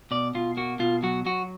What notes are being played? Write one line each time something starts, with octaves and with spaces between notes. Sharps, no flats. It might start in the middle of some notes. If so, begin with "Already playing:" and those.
B2 D5
B2 F4
A#3 F#4
B2 F4
F#3 F#4
F#3 F#4